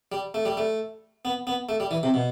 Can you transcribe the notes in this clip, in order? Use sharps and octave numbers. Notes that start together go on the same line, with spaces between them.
G3
A3
G3
A3
B3
B3
A3
G3
E3
C3
B2